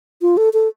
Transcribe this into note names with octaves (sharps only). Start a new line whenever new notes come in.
F4
A4
A4